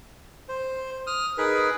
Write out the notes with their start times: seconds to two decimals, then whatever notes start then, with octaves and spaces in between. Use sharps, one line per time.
0.49 C5
1.07 D#6 F6
1.38 D#4 G#4 A#4 B4